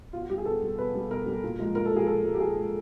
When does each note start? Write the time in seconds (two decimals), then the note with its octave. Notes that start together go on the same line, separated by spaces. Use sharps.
0.13 B2 F4
0.21 F#4
0.29 G3 G4
0.38 G#4
0.45 B2 A4
0.62 G3
0.78 B2 B4
0.95 G3
1.11 B2 A#4
1.26 G3
1.44 A#2
1.59 F3 G#3
1.75 A#2 A#4
1.85 A4
1.92 F3 G#3 G#4
2.07 A#2 A4
2.24 F3 G#3
2.34 G4
2.40 A#2 G#4
2.56 F3 G#3